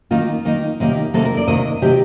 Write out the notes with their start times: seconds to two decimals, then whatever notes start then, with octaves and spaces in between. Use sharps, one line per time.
0.11 D#3 A#3 D#4 F4
0.45 D#3 A#3 D#4
0.80 C3 D#3 A#3
1.14 C3 D#3 A#3 A4
1.25 A#4
1.37 D5
1.48 C3 D#3 A#3 D#5
1.82 C3 D#3 A#3 G4